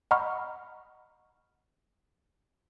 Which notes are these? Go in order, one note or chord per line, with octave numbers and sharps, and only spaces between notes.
D#5 F#5 A#5 B5 C#6 F6